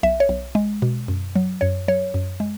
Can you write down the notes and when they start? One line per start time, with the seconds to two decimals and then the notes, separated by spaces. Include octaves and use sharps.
0.03 B1 E5
0.20 C#5
0.29 B1
0.55 G#3
0.82 B2
1.08 F#2
1.36 F#3
1.61 F#2 C#5
1.88 F#3 C#5
2.14 F#2
2.40 G#3